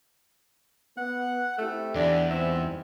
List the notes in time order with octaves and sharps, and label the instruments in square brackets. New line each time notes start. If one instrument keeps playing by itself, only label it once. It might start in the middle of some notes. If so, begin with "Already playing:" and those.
[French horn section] B3 [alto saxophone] F#5
[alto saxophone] A3 [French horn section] C4 E4 G4
[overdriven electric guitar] E2 [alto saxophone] D4
[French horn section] G#2 G3 C4 [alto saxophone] E5